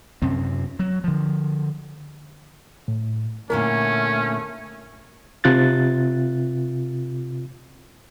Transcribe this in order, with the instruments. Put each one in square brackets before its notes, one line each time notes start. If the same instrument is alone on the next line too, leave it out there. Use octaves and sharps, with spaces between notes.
[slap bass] F#2 C3 C4 C#4
F#3
D3 F3
[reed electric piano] A2
[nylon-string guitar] A#2 D3 E4 [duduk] A3 [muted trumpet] C#4 [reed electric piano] A#4
[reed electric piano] C3 F4 F#6 A6